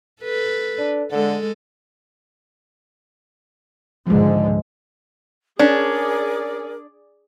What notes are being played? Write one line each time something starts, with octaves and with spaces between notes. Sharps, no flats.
A4 B4
D4
D3 G#3 A4
C#2 G#2 D3 F3 G#3
C#4 D4 G#4 A#4 D5